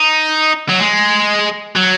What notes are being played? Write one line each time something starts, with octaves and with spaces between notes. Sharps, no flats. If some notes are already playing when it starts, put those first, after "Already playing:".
Already playing: D#4
F#3
G#3
F#3